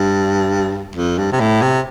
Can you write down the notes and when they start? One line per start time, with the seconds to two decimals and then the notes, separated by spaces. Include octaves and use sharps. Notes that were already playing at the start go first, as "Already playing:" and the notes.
Already playing: G2
0.96 F2
1.18 G2
1.32 C3
1.40 A2
1.62 C3